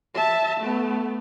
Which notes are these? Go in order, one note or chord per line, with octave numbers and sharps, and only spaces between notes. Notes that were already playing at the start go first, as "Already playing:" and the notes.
E5 A5
A3 B3